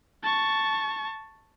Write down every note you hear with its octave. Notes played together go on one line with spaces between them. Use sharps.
A5 C#6